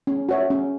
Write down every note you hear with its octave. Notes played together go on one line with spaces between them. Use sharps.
C#4
F#4 C#5 E5
C#4